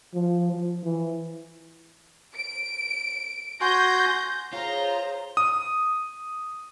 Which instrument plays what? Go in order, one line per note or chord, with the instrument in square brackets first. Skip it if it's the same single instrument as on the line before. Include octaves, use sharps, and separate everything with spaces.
[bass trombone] F3
F3
E3
[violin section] D7
[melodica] F#4 G#5 C6 [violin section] G6 A#6
[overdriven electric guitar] F4 [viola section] G#4 C5 [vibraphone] C#5 [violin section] A#5
[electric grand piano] D#6